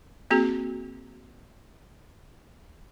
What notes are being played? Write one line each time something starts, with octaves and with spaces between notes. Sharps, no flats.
A#3 C4 F#4 G#4